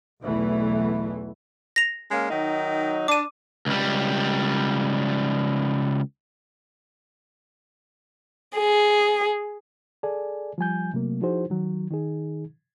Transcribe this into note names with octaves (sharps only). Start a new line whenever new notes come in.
B1 E2 E3 A3
A#6 F7
G#3 A#3 C#4
D#3 F#3 D#4
D4 D6 D#7
C#2 G3
G#4
G#4 A4 D5 G#5
F3 G3 G#5 G6
C3 F#3 A3 A#3
F3 D#4 E4 F#4 G#4 C5
D#3 F#3
D#3 D#4 G#4